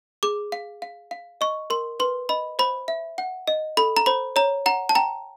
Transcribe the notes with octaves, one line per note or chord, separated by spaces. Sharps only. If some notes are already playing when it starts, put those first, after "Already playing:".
G#4 D6
F5
F5
F5
D#5 C#6
A#4 C6
B4 C6
D#5 B5
C5 B5
E5
F#5
D#5
A4 B5
A#5
C5 B5
C#5 A#5
F#5 A#5
A5
G5 A#5